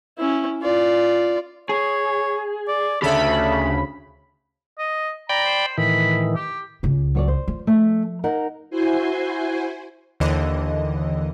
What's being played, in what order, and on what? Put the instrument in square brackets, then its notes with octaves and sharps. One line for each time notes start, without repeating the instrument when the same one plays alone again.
[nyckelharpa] C#4 E4
F4 D5
[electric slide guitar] G#4 [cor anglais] C#5
[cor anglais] D5
[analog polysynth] D2 C#3 B5 [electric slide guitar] G4 E5 [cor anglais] A4
[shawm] D#5
[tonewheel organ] D5 G5 B5 [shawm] A#5
[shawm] C5
[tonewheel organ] A2 D#3 E3 [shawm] B5
[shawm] G4
[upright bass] C#2 C#3
[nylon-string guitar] F#3 C#5 D5
C5
[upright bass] F3
[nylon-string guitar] A3
D#4 A#4 F#5
[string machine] E4 F#4 C5 G#5 C6
[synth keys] D#2 D3 E3 D#5